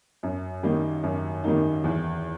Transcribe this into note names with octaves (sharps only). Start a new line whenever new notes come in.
F#2
D#3 G3 A#3 D#4
F#2
D#3 G3 A#3 D#4
E2